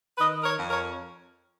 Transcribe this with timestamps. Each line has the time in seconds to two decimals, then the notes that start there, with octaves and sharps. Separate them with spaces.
0.18 D#3 B4 D#5
0.44 A#4 C#5
0.57 F2
0.70 A#4 C#5